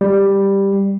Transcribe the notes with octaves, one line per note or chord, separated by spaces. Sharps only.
G3